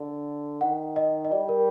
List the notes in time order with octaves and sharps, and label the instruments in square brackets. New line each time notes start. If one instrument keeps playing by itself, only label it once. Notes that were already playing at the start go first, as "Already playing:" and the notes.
Already playing: [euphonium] D3
[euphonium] D#3 [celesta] F#5
[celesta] D#5
D#5
[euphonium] G3 [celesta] D5
[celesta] A#4